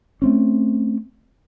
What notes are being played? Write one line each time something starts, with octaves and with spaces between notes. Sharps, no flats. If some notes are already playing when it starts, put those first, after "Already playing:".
A3 C4 C#4